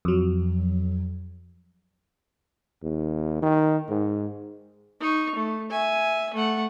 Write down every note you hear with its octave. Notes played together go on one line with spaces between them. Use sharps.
F2 F#3
D#2
D#3
G#2
D#4 C#6
A3
E5 G#5
A3 F#5